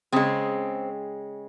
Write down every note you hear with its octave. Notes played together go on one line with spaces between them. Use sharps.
C#3 G#3 C4